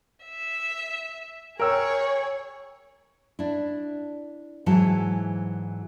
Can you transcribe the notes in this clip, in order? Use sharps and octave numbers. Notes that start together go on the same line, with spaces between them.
E5
G#4 A#4 C#5 G5 E6
D4 E4
G#2 E3 F#3 E4 A5